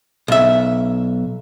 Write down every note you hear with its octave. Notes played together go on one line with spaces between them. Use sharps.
B1 E5